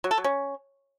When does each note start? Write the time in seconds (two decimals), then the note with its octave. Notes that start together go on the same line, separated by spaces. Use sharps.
0.04 F#3
0.11 A4
0.18 F#3
0.24 C#4